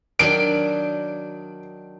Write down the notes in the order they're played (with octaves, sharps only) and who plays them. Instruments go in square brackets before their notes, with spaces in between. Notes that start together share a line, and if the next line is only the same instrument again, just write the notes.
[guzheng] D#3 F#3 D4 [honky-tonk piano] D7